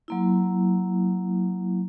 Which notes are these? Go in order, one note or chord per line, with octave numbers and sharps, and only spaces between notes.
F#3 A#3 E4